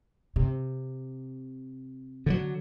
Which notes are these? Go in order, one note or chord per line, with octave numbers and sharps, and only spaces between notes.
C3
D3 E3 F#3